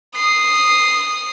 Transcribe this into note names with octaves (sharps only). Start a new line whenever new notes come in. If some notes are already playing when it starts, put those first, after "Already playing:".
D#6 C7